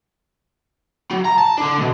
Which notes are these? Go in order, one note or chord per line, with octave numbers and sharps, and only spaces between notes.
F#3
A#5
A5
D3 D4
C2 B2